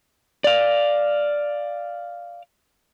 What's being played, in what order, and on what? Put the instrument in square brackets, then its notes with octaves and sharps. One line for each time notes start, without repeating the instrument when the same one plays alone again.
[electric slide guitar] D5 F5